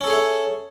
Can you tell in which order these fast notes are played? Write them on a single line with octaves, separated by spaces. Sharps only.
C#4 A4 G#4 C#5 E5